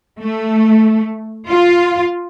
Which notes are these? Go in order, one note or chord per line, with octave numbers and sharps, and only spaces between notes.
A3
F4